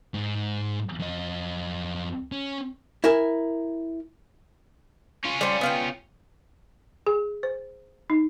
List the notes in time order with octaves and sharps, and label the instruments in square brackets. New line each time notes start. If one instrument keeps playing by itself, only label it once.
[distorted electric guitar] G#2
F2 D#5
C#4
[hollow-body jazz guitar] E4 A#4 G#5
[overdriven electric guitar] C#4 F4
[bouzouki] G3 C5
B3 F5 G5
[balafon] G#4
C5
D#4